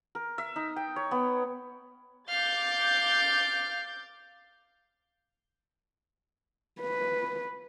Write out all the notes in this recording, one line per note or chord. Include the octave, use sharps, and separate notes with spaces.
A#4
E5
D#4
G5
C#5
B3
F5 D6 G6 A6
B4